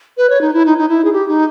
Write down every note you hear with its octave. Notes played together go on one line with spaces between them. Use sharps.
B4
C#5
D#4
E4
D#4
D#4
E4
G#4
G4
D#4